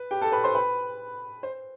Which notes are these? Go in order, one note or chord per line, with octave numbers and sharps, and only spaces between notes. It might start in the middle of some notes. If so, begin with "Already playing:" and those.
Already playing: B4
G4 G5
A4 A5
B4 B5
C5 C6
B4 B5
C5